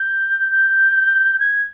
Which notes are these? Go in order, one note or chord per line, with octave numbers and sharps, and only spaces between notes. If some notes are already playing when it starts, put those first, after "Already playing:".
Already playing: G6
G6
G#6